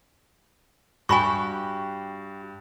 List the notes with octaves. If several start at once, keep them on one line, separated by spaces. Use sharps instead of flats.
G2 F#4 G4 G#5 B5 C#6